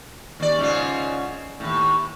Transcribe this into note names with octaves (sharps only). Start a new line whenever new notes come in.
D#2 D5
G#2 C#3 F4
D#2 A2